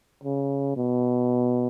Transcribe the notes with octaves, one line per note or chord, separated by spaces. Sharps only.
C#3
B2